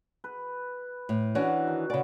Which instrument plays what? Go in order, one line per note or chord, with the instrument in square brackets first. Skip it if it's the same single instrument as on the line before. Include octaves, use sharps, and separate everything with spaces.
[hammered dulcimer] B4
[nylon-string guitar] A2
[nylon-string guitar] E3 C#4 D4 [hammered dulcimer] F#4
[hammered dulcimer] D#3
[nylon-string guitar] C#3 D5 [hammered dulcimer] F#4 B4